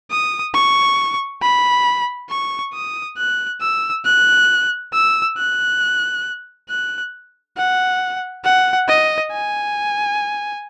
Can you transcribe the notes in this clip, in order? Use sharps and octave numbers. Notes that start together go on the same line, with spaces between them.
D#6
C#6
B5
C#6
D#6
F#6
E6
F#6
E6
F#6
F#6
F#5
F#5
D#5
G#5